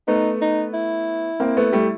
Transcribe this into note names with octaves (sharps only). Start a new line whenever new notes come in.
A3 B3 D#4
D#4
E4
A#3 C4
A3 B3
G3 A3